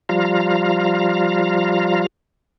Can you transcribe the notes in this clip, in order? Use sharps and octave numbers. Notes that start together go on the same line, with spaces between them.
F3 G3 F4 F5 A#5